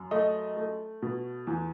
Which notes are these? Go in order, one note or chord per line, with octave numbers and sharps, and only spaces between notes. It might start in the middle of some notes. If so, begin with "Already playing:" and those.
Already playing: F#2
A3 D#5
A3
B2
E2